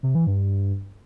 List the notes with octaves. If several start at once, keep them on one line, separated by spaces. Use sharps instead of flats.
C3
E3
G2